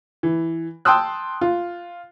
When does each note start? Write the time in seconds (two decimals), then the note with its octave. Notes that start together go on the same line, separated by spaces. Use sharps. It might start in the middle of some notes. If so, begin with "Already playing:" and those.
0.23 E3
0.85 G5 A5 C6 D#6 E6 F#6
1.41 F4